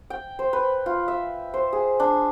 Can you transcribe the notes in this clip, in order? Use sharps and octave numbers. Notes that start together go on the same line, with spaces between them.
G5
C5
B4
F4
E5
C5
G#4
D4